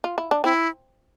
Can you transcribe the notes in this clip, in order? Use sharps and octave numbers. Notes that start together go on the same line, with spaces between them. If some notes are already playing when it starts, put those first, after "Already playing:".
F4
E4
D4
C4 E4